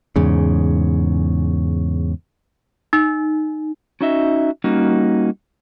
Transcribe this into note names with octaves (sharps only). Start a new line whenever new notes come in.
E2 G#2 C#3
D#4
C#4 D#4 F#4 D#5 E5
G3 A#3 C#4 D#4 F#4